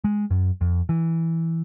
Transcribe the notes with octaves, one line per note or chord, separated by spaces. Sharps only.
G#3
F#2
F2
E3